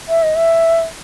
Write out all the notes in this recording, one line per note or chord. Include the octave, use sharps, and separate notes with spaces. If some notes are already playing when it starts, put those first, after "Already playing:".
E5
D#5
E5